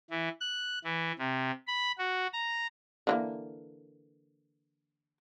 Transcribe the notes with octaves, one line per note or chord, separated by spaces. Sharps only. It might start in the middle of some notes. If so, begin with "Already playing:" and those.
E3
F#6
E3
C3
B5
F#4
A#5
D3 E3 A#3